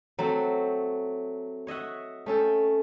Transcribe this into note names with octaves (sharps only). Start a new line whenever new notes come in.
F#3 A3 C4
C#5 D#5 E5 F#5
A3 C#4 A4 G5